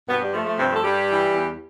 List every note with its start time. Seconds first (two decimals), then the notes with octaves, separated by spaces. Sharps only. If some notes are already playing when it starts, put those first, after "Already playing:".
0.09 G2 B2 B3
0.22 G3
0.34 F3 A3
0.47 A3
0.59 G2 C3 C4
0.71 A3 A4
0.84 G2 G3 G4
1.08 E3
1.34 E2